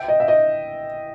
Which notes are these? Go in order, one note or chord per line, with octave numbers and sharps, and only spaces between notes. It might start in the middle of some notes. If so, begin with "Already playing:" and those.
Already playing: E5 G5
D#5
E5
D#5